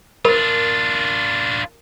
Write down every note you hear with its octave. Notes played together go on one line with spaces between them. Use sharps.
D4 F4 A#4